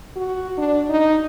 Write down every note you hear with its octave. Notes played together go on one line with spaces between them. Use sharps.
F#4
D4
D#4